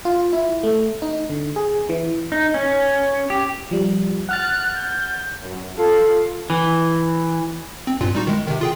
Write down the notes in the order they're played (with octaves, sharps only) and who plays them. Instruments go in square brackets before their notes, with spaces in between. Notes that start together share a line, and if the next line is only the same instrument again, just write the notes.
[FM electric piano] F4
E4
A3
D#4
D3
G#4
E3
[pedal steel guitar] D#4
C#4
G4
[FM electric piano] F3 G3
[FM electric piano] F#5 F6 A6 [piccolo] F#6
[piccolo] G6
[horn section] F#2
F4 A4
[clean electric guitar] E3
[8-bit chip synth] C4
G2 A#2 F4
G3 D#4 F#4
D#3 G#3
C3 D#3
F4 G#4 G5